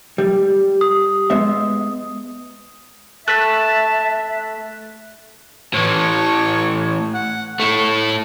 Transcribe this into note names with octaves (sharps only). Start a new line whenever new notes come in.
G3
D#6
G#3 B3 E5
A3 E5 A5 F#6 B6
A2 E3 C#5
F#5
A3 E4 C#6